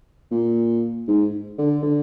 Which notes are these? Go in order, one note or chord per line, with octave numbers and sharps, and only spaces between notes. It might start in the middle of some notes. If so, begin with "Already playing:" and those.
A#2
G#2
D3
D3